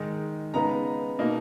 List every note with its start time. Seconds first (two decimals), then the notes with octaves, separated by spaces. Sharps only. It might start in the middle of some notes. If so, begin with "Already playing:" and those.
Already playing: D#3 G#3 D#4
0.54 C#3 G#3 B3 D#4 A#5
1.19 B2 A#3 D#4